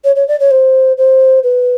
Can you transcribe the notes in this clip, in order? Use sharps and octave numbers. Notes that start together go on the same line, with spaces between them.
C#5
C#5
D5
C#5
C5
C5
B4